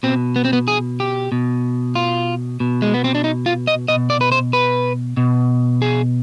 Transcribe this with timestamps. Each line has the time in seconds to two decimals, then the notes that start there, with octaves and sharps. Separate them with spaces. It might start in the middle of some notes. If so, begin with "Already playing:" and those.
0.03 B2 C4
0.36 B3
0.45 C4
0.53 B3
0.68 G#4
1.00 G4
1.32 B2
1.95 F4
2.60 B2
2.82 G#3
2.94 B3
3.04 C4
3.15 D4
3.24 D#4
3.46 F4
3.67 D#5
3.88 B2 D#5
4.10 D5
4.21 B4
4.32 C5
4.53 B4
5.17 B2
5.82 G#4